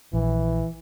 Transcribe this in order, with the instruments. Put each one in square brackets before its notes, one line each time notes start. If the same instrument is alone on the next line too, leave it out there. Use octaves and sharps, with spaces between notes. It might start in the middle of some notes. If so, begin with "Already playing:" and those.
[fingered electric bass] A#1 [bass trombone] E3